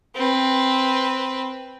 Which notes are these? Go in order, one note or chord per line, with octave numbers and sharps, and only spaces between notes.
C4 B4